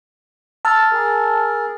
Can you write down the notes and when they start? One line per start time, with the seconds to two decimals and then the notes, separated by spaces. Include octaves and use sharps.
0.65 A5 E6 F6 A6
0.92 G#4 A#4